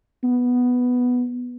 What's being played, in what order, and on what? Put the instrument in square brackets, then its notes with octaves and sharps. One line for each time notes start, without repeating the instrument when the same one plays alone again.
[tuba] B3